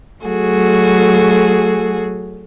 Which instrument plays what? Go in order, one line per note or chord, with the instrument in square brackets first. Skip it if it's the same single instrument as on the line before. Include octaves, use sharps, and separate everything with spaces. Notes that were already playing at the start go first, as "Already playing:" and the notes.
[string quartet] F#3 A3 F#4 G#4